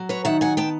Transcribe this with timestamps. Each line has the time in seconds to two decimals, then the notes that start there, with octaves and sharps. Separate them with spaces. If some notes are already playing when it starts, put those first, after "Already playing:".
Already playing: F#3
0.09 B4 C#5
0.25 D#3 E5 F#5
0.41 F#5 G#5
0.57 B3 G5 A5